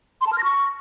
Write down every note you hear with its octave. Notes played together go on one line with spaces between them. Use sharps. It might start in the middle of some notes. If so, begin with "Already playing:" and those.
C6
A5
F6
A#6
C#6